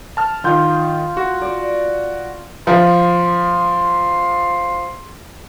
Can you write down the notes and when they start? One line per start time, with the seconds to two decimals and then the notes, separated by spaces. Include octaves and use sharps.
0.17 A5 F6
0.44 D#3 F4 G6
1.17 F#4
1.42 D5
2.67 F3 C6